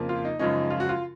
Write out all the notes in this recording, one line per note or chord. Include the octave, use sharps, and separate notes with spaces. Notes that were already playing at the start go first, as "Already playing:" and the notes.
Already playing: F2 C#3 F3 A#3
F4
D#4
F#2 C#3 F3 G#3 C#4 D#4
F4
F#4
F4